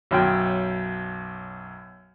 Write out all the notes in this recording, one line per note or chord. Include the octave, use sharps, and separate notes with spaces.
B1 F#2 G5